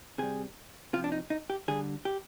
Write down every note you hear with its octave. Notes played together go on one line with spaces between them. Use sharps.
C3 G3 G#4
C3 F3 F4
D4
D#4
D#4
G4
D3 G3 G#4
G4